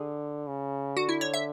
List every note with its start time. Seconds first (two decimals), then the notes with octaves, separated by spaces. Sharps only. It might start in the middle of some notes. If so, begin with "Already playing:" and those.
Already playing: D3 G#4
0.47 C#3
0.96 D3 F#4
1.09 E4
1.21 C#5
1.34 E5